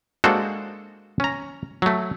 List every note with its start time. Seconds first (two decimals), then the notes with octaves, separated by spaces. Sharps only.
0.24 G#3 A#3 D4 F#4 A4 C5
1.20 C#4 A#5
1.82 F#3 A3